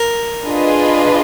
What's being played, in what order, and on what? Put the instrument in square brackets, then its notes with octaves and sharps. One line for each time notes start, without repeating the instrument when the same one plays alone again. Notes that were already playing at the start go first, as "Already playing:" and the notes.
Already playing: [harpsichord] A#4
[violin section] D4 F4 G#4 B4 D#5